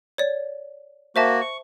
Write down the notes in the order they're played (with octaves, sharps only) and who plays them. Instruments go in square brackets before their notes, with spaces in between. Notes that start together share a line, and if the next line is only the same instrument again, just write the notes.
[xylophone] C#5 D5
[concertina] A#3 F#4 [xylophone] C5 E5 A5
[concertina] C#6